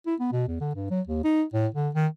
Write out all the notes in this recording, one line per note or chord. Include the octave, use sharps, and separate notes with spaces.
E4
B3
B2
E2
D3
G2
F#3
D#2
D#4
A2
D3
D#3